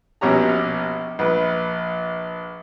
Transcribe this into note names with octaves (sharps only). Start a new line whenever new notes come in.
A#1 B2 C#4 G4 A#5
A#1 B4